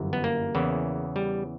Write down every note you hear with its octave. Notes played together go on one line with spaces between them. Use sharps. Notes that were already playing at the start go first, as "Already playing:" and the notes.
Already playing: G1 F#2 E3
B3
A#3
E2 C#3 E3
G3